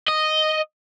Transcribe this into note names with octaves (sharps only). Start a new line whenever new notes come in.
D#5